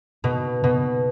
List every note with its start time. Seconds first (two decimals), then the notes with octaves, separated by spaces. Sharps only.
0.24 B2
0.64 B2